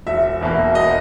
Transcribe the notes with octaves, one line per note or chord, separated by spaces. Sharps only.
E1 E5
E2 B2 A#3
E1 D#5